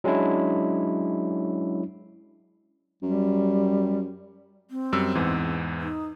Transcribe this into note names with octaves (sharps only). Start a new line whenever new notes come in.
F#3 G#3 C#4 D4 E4
F#2 G3
C4
F#2 G3 E6
E2 G#2 E3
D#4